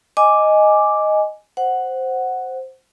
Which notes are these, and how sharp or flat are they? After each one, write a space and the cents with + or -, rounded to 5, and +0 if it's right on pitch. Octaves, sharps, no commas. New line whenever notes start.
D#5 +0 G#5 +0 D6 +0
C5 +0 F#5 +0